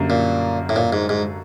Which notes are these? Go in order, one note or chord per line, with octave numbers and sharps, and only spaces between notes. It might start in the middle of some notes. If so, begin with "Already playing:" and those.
Already playing: F#2 D3 G3 A#3
A#2
A2
A#2
G#2
G#2